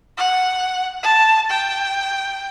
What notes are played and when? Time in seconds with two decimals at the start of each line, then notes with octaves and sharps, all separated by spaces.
0.18 F#5
1.03 A5
1.50 G5